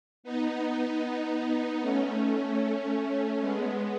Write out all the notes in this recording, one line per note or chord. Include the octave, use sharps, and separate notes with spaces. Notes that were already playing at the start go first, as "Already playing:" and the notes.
B3 D#4
A3 C#4
G#3 B3